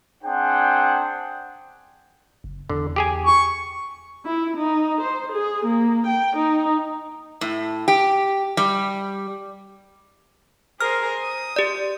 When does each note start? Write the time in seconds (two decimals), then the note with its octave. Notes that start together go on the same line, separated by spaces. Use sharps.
0.23 C4 D4 G#4 C5 F#5 G5
2.44 F#1
2.69 E2 D3
2.96 G4 G#4 G#5
3.25 C#6
4.25 E4
4.56 D#4
5.01 C5
5.32 G#4
5.65 A#3
6.06 G5
6.36 D#4
7.41 A2
7.88 G4
8.57 G3
10.81 G#4 A#4 C5 F6
11.22 D#6
11.56 G4 D5